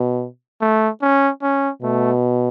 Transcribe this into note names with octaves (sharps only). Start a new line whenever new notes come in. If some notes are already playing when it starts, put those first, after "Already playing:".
Already playing: B2
A3
C#4
C#4
B2 A3